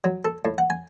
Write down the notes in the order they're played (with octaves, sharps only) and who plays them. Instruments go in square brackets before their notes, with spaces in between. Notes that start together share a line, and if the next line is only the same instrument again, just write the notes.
[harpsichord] F#3
A4
A2
F#5
G#5